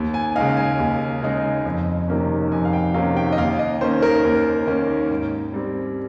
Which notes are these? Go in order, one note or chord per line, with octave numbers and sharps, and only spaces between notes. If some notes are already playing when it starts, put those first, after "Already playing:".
Already playing: D#2
G#5
C#3 G#3 D#4 F5
G#5
D#2
C#3 G#3 D#4
F2
C3 D#3 A#3 C#4
F2 G#5
F5
G5
C3 D#3 A#3 C#4 F5
G5
D#5
D#2 F5
D#5
D#3 A#3 C#4 C5
A#4
D#2
D#3 A#3 C#4
G#2
G3 C4